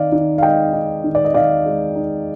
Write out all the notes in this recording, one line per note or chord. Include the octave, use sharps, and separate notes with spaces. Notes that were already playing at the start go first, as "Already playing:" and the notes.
Already playing: D#3 D#4 D5 F5
D#3
F5
G#3 D#5 G5
D#4
D#3
D5
D#5
D#3 D5 F5
G#3
D#4